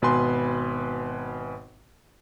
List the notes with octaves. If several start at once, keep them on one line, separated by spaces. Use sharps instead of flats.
G#1 B2 B4 G#5 C6